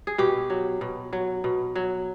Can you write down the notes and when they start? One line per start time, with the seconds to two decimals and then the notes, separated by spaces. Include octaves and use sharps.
0.07 G#4
0.18 B2 G4
0.50 F#3
0.81 B2
1.13 F#3
1.44 B2
1.76 F#3